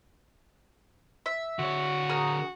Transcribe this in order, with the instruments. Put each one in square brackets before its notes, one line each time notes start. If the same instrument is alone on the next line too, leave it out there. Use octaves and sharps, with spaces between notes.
[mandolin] E5
[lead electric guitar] D3 C#5 [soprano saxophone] F#4
[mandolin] G#4 A#4 F6